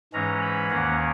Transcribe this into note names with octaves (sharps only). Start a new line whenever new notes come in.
G#2 E3 G#3 C#4 A#5
B5
D#2 D#3 A#3 C#4 F#5